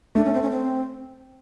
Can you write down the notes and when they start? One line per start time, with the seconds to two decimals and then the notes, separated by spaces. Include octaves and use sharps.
0.15 A3 D4
0.25 C#4
0.34 C4
0.42 C#4
0.51 C4